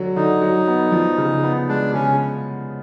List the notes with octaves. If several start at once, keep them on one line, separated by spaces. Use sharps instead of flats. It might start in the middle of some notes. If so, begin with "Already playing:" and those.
Already playing: D3 F#3
D3 D#4
F#3
B3
F3
C#3
B3
G#3 D4
C#3 C#4